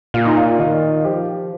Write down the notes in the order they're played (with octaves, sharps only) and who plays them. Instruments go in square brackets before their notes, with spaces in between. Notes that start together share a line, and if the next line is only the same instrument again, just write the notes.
[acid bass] A#2 [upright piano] F4
[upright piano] D#4
F4
[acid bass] D#3 [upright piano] F4
[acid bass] F3 [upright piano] G4